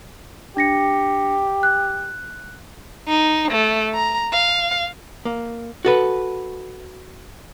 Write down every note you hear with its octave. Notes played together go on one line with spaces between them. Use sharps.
D4 G4 A#6 C#7
F#6
D#4
A3
A#5
F5
A#3
F#4 A4 B4